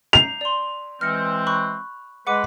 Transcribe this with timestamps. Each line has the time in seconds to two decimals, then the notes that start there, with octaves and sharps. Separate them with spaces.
0.13 A#5 G6 C7 F7
0.41 D5 C6
1.01 E3 G#3 C4 F6 A#6 C#7
1.47 B5 C#6 F#6
2.27 G#3 B4 F#5 D6 D#7